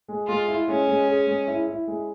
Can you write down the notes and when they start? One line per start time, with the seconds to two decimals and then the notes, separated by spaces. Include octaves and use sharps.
0.08 G#3
0.28 G#3 F4
0.48 E4
0.68 G#3 C#4
0.87 G#3
1.08 G#4
1.27 G#3
1.48 E4
1.67 E4
1.87 G#3